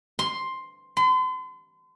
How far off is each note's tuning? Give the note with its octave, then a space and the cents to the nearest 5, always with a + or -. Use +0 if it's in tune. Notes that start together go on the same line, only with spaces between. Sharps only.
C6 +5
C6 -40